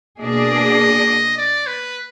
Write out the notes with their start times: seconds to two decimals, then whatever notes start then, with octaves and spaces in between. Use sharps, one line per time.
0.19 B2 A#3 D4 G#4 D5 D#5
1.37 D5
1.67 B4